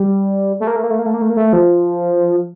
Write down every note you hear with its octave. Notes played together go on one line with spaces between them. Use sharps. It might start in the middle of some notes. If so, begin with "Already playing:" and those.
Already playing: G3
A3
A#3
A3
A#3
A3
A#3
A3
A#3
A3
A#3
A3
F3